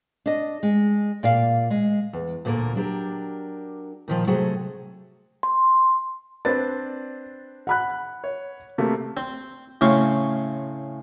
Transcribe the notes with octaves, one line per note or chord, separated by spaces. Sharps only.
D4 D#5
G#3
A#2 D5 F5
G#3
E2
D2 A#2 D3 A#3 A#4
F#3 D4 G4 A#4
A#2 D#3 F3
C3 F#3 A3 F#4 G#4 C5
C6
C4 D4 B4 A6
F#5 B5 F#6
C#5
C3 A3 A#3
C4
A2 C#3 C4 F5 C#6